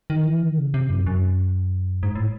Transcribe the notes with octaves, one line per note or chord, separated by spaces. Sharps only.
D#3
E3
D#3
C#3
C3
F#2
F#2
G#2
A2